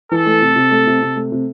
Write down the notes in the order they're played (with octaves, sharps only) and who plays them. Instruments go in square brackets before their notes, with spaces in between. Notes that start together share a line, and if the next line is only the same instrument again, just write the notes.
[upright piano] E3 [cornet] A4
[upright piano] A3
C3
C3
A3
C3
C3
A3
C3